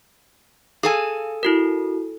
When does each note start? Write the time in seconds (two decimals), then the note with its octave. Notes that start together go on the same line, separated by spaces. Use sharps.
0.83 G#4 A4 F5 G#5
1.43 E4 F#4 A#4